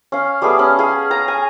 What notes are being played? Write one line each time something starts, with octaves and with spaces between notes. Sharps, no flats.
C#4 F5
G3 A3 B3 G#4
C#4
G#4 F5
A#5
G#5